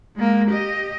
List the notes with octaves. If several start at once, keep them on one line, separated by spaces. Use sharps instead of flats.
G#3 A#3
G4 D#5